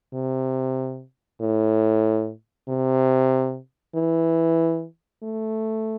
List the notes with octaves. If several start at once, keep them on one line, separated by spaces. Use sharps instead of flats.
C3
A2
C3
E3
A3